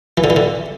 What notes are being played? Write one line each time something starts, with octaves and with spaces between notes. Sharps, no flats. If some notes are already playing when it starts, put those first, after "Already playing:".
E3
D3
E3
D3